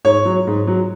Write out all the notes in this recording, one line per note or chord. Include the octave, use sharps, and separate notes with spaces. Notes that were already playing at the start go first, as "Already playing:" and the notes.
G#2 C#5
F#3
G#2
F#3